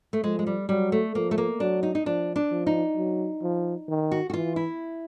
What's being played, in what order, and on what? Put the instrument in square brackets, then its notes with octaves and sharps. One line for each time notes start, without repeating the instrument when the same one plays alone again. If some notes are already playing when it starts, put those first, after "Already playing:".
[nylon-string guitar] A3
[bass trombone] F3 [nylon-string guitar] G#3
[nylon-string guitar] G#3
G3
[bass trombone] F#3 [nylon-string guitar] G3
[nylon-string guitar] A3
[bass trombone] F3 [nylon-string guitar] A#3
[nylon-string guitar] A3
A#3
[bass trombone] F#3 [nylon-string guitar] D4
[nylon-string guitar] D#4
D#4
[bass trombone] F3 [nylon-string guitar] D4
[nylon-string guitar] D4
[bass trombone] F3
[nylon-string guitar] D#4
[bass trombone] F#3
F3
D#3
[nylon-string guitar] F#4
F#4
[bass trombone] E3 [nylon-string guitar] F4
[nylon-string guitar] E4